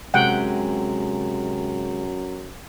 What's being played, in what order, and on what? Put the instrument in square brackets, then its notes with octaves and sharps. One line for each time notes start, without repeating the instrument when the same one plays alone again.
[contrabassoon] F#2 [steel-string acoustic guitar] C3 G#3 [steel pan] F#5 G5